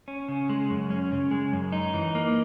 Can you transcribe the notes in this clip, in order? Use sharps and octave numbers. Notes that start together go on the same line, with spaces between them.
C#4
C#3
G#3
F#2
C#4
C#3
G#3
F#2
D#4
E3
A#3